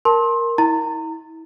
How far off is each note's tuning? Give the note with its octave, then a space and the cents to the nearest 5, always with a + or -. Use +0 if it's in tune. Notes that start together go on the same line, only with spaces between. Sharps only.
A#4 +0 A5 +0 C6 +20
E4 -35 A#5 -30